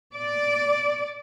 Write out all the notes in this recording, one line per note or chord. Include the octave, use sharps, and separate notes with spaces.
D5